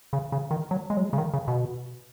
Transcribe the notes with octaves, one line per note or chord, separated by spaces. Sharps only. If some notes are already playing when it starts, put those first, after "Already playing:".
C#3
C#3
D#3
F#3
G#3
F#3
G#3
C#3
D#3
C#3
B2